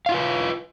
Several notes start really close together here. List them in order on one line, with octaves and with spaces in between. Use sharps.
F5 E4 F4 B4